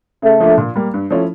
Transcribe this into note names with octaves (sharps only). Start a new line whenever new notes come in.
C#3 A3
F3 A#3 D4
A#2
G3 A#3
G2
F3 A3 C#4 E4